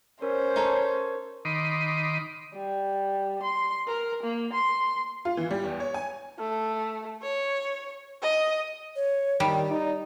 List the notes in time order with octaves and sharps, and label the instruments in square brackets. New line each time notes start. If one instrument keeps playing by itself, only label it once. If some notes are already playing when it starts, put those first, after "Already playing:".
[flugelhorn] C#4 [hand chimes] A#4 [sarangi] C5
[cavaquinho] D#4 A4 C#5
[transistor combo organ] D#3 D#5 B5 C6 D6
[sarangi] G3
C6
A#4
A#3
C6
[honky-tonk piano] F4
E3
G3
E2
C#5
G#5
[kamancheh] A3
C#5
D#5
[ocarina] C#5
[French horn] D#3 [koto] G3 [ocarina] D5
[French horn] D#4